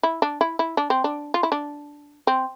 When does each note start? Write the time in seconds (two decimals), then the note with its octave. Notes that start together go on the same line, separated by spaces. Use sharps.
0.03 E4
0.22 D4
0.41 E4
0.59 E4
0.77 D4
0.90 C4
1.04 D4
1.34 F4
1.43 E4
1.52 D4
2.27 C4